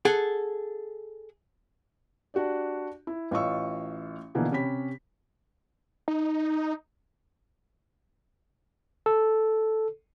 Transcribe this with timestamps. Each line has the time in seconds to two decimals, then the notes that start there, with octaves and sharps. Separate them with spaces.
0.05 G#4 A4 F#5
2.34 D4 F#4 G4 D5
3.07 E4
3.31 A1 F4 D#5 F5 C#6 E6
4.35 B2 D3 E3 F3 A#3
4.51 C3 C#4 G4 B5 B6
6.08 D#4
9.06 A4